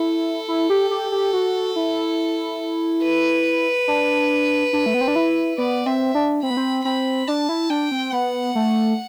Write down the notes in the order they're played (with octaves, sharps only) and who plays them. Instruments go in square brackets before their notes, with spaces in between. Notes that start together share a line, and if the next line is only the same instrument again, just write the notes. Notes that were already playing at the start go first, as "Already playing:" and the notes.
Already playing: [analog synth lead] E4 [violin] A4
[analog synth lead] E4
G4
G4
G4
F#4
E4
[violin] B4
[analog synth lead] D4
D4
A3
B3
C4
D4
E4
[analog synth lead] B3 [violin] D5
[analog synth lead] C4 [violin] E5
[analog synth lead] D4
[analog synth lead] C4 [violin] B5
[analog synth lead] B3
C4
[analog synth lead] C4 [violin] B5
[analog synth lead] D4 [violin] A5
[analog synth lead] E4
[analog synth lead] D4 [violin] G5
[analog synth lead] C4
[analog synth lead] B3 [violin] F#5
[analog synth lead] A3